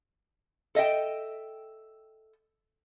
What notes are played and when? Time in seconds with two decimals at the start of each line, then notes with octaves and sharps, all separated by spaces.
0.75 A4 D#5 E5 G5